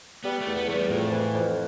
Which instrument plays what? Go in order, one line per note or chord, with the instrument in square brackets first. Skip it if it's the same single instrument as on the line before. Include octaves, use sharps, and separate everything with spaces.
[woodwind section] G3 [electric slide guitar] B3
[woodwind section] E2 [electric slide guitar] A3
[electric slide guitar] B3
[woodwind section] E2 [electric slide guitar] A3
[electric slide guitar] G3
[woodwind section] F2 [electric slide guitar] A2
[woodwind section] E3
F2